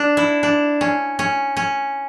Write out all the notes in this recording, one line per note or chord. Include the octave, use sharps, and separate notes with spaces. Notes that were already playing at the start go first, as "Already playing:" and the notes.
Already playing: D4
E4
D4
C#4
C#4
C#4